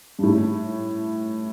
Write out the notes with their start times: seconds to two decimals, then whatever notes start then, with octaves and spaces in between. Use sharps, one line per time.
0.19 G2
0.23 A2